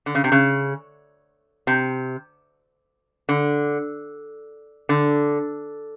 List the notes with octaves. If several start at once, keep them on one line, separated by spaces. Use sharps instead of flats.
D3
C#3
C3
C#3
C3
D3
D3